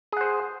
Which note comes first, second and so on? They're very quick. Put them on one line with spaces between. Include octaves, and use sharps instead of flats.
G#4 F#5 C5